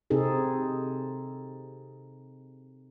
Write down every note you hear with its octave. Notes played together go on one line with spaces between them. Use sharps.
C3 C4 D#4 G#4 A4